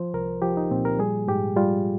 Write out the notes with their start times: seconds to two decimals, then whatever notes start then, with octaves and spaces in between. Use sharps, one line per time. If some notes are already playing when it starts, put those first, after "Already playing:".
Already playing: F3 C5
0.14 C2 A#4
0.42 F3 G4
0.57 D#4
0.71 A#2 C4
0.85 A#4
0.99 G3 G#4
1.28 G#2 G4
1.56 G3 F4